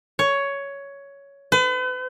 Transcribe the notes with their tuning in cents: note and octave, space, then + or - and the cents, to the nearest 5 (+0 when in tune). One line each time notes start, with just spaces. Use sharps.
C#5 +10
B4 +40